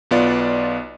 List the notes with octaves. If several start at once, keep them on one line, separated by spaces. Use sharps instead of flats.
B1 B3 F4 D5